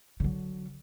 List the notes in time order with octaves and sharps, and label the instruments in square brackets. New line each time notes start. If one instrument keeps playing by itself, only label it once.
[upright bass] D3 F#3